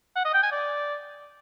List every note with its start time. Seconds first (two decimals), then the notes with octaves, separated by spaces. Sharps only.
0.16 F#5
0.25 D#5
0.34 G5
0.43 G#5
0.52 D5